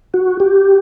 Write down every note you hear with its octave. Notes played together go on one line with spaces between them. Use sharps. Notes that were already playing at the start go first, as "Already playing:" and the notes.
F#4
G4